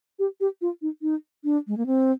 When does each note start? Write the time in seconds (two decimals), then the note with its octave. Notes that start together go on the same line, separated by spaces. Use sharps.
0.19 G4
0.40 G4
0.61 F4
0.82 D#4
1.02 D#4
1.44 D4
1.67 G#3
1.77 A#3
1.86 C4